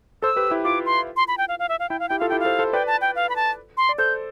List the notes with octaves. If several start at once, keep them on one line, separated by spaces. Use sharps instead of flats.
A4 C5 E6
G4 B4
E4 G4
F4 D6
C6
C6
B5
G5
F5
F5
E5
F5
E4 G5
F5
E4 G4 G5
F4 A4 F5
E4 G4 G5
F5
A4 C5
A4 C5
B4 D5 G5
A5
G5
F5
B5
A5
C6
D5
A4 C5 G6